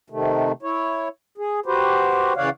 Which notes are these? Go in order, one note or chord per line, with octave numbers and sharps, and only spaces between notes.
C3 D#3 A3
E4 C#5
G#4
F#4 G4 B4 C5
C#3 E3 C#5 D5 F5 F#5